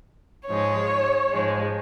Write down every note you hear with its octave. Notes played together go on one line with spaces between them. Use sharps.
G#2 F3 G#3 C#5
G#2 F3 G#3